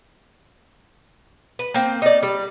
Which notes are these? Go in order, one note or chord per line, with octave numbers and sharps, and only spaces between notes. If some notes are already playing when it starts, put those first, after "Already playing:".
B4
A#3 C4
D#4 D5
G3